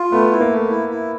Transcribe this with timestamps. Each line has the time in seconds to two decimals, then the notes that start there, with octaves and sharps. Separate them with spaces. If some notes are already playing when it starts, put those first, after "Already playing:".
Already playing: F4
0.12 A3 B3
0.31 E4
0.41 A#3
0.51 A3
0.70 E4
0.89 E4